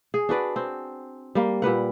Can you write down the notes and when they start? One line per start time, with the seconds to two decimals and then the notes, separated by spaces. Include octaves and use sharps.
0.14 G#4
0.29 D4 F#4 B4 D5
0.56 C4
1.35 G3 A#3
1.62 A#2 G3 B4 F#5